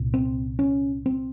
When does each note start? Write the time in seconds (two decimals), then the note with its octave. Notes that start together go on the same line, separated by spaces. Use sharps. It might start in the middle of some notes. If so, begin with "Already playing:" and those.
Already playing: C2 A#2
0.14 C4
0.59 C#4
1.06 C4